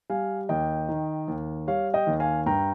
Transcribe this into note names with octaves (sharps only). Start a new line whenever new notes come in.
G3 F5 G#5
D#2 D#5 G5
D#3
D#2
G3 C#5 F5
D#5 G5
D#2
F5 G#5
G2 G5 A#5